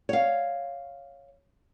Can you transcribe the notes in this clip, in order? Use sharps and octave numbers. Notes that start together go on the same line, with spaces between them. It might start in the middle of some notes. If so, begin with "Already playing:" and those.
C#5 F5